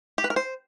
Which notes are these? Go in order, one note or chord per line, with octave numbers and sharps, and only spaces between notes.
G4
B4
A#4
C5